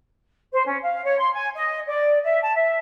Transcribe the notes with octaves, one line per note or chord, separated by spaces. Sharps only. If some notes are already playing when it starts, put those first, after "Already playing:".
C5
C#4
F5
C#5
C6
G#5
D#5
D5
E5
A5
E5